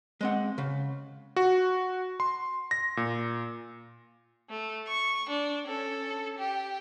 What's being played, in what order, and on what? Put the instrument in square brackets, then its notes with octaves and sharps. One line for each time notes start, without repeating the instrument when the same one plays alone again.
[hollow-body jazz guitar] G#3 C4 F#5
C#3
[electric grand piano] F#4
C6
A#6
A#2
[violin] A3
C#6
D4
C#4 A4
G4